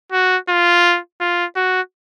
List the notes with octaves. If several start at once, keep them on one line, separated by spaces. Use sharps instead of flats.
F#4
F4
F4
F#4